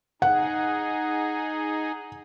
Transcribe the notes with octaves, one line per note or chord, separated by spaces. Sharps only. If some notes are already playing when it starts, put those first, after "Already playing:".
D#4 G#4 F#5